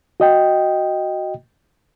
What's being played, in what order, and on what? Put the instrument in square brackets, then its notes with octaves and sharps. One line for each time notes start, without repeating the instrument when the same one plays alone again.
[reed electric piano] F#4 D#5 G5